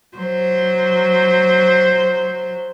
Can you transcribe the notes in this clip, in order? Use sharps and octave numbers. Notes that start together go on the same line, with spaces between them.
F#3 C5